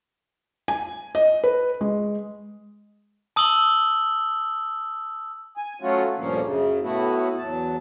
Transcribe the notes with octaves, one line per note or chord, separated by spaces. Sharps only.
G#5
D#5
B4
G#3
A5 D#6 E6 F#7 G7
G#5
F#3 A3 C#4 F4 F#4
D2 G2 A#2 F3 A#3 C#4
F#2 C#3
A2 A3 B3 E4 F#4
E2 F#3 A5